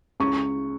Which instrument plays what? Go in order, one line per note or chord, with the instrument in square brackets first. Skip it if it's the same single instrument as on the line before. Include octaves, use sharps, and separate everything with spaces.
[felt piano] C#2 C#6